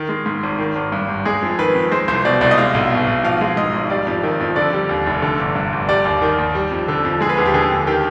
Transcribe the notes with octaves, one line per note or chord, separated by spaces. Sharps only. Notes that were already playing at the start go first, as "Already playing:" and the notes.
Already playing: D#3
G#3
G#2
G#1
D#3
G#1
G2
G#1
G#3 G#4
F2
D#3 B4
F2
G#3 C5
C2 C5
B2 D5
C2 D5
D#5
G#3 F5
B1
B2
B1
F3 F5
G#3
G#2 D#5
G#1
G3 D5
F2
D#3
F2
D3 D5
G3
D#2
F1
D3
G1
G2
G1
G3 D5
D#2
D#3
D#2
G3
F2
D3
F2
G#3 G#4
B4
D#2 G#4
G4
D3 G#4
D#2
D#3 G4